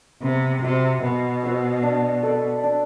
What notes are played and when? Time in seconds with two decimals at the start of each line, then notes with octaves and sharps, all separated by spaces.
0.22 C3 B3
0.62 C3 F#4 C5 E5
1.03 B2 B3
1.43 F#4 C5 E5
1.83 D4
2.23 A4 D5
2.63 D4